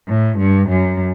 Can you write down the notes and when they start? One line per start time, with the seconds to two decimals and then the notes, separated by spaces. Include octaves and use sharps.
0.09 A2
0.39 G2
0.70 F#2